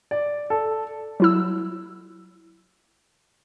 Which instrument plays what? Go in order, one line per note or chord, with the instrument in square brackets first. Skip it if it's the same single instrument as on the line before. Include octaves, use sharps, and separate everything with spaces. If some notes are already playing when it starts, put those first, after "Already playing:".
[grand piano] D5
A4
[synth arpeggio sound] F#3 E4 E6